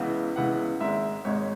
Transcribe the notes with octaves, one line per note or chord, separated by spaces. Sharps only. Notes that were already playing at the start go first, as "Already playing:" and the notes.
Already playing: C#2 C#3 E3 B3 E4 F#5
C#2 C#3 E3 B3 E4 F#5
G#1 G#2 G#3 E5
G#1 G#2 G#3 C#5